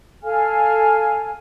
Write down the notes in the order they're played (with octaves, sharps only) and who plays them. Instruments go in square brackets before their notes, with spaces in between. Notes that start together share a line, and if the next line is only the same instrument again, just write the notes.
[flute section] A4 F5 G#5 F6